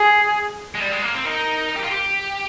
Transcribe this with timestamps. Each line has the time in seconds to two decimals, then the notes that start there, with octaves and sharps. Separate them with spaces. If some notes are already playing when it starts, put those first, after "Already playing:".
Already playing: G#4
0.75 G#3
0.80 G3
0.92 G#3
1.02 A#3
1.14 C4
1.24 D#4 A#4
1.76 G4
1.84 F4
1.90 G4